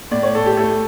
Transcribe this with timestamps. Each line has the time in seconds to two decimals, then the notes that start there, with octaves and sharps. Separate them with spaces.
0.11 A2 D5
0.23 C#5
0.35 A2 A4
0.46 G4
0.57 A3 A4